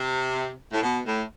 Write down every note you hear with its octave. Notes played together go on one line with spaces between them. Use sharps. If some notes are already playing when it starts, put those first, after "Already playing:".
Already playing: C3
A2
B2
A2